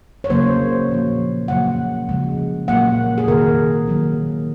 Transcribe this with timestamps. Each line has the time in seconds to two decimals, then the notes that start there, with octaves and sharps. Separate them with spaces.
0.24 C#5
0.30 C#3 F#3 A#3 C5
0.89 A#2 F3 A#3
1.48 C#3 F#3 A#3 F#5
2.09 C#3 F3 G#3
2.68 A#2 F#3 A#3 F#5
3.18 G#4
3.27 C3 D#3 A#3 A#4
3.87 D#3 F#3 A#3